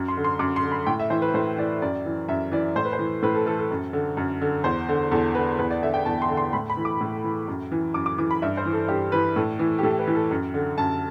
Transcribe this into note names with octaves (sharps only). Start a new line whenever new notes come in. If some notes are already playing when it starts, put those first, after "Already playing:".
Already playing: F#2
C6
D3
C6
F#2 D6
C6
D3
B5
A2 G5
E5
E3 C5
B4
A2 C5
E3 D5
F#2 D5
E3
F#2 E5
E3 D5
A2 C5
B4
C5
E3
A2 B4
A4
E3 A4
A4
F#2
D3
F#2
D3
E2 C5
D3
E2 A4
D3 B4
E2 B4
D5
D3 E5
G5
E2 A5
C6
D3
C6
A2 B5
B5
E3
D6
A2
E3
F#2
E3
F#2 D6
D6
E3 D6
B5
G2 E5
C5
E3
A4
G2 G4
E3 B4
A2 A4
E3
G4
A2 A4
B4
E3
A4
F#2
D3
F#2 A5